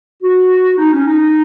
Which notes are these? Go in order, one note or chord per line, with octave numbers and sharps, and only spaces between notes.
F#4
D#4
C#4
D#4